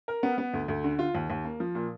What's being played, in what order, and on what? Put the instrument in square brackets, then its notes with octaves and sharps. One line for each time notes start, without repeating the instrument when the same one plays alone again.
[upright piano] A#4
B3
B3
D2
D2
D3
F4
D#2
D#2
A#3
F3
A#2